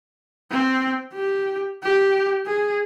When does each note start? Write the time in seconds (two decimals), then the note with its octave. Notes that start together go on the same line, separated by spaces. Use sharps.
0.51 C4
1.14 G4
1.83 G4
2.46 G#4